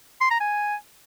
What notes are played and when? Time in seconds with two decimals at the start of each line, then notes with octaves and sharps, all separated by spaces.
0.21 C6
0.31 A#5
0.40 G#5